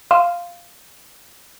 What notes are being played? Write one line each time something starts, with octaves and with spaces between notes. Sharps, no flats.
F5 C6 F6 D#7 E7